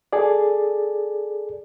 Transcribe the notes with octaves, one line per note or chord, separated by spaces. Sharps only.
G#4 A4 D5